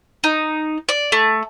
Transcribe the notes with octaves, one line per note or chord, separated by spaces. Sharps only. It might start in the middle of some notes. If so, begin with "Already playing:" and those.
D#4
D5
A3